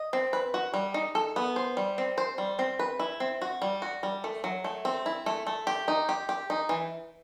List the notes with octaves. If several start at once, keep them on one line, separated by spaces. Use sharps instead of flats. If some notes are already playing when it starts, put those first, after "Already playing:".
Already playing: D#5
C4
B4
F#4
G3
D#4
A4
B3
C5
G3
C4
C5
G3
C4
B4
E4
C4
F#4
G3
F#4
G3
A3
F#3
A3
C4
E4
A3
A3
G4
D#4
G4
G4
D#4
E3